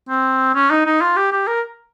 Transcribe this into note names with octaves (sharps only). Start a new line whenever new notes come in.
C4
C#4
D#4
D#4
F4
G4
G4
A#4